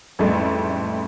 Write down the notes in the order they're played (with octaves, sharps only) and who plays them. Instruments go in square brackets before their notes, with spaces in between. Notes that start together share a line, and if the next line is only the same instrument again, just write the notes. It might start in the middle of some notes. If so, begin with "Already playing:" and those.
[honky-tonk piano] A1 F2 G#2 G3 A3